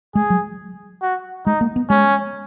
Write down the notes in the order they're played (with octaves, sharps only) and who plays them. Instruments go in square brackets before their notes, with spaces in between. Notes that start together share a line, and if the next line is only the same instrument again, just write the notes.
[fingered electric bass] G#3 [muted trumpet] G#4
[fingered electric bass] F#3
[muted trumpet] F#4
[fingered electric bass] G#3 [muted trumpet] D#4
[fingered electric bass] A#3
B3
[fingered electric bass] G#3 [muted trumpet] C#4